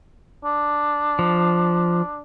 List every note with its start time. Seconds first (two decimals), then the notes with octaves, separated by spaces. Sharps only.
0.45 D4
1.19 F3